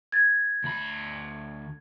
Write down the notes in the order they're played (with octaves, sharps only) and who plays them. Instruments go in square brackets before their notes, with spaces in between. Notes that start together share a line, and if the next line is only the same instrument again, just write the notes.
[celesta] G#6 A6
[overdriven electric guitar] D2 B5